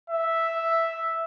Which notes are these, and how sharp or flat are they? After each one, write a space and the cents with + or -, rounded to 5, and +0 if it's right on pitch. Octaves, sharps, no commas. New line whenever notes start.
E5 +0